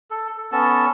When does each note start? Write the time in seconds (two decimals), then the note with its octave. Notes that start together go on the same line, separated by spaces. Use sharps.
0.11 A4
0.38 A4
0.52 B3 C#4 A4 A5